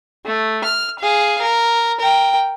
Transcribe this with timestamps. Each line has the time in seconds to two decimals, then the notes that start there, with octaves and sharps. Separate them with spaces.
0.26 A3
0.65 F6
0.99 G#4 F5
1.41 A#4
2.00 A#4 G5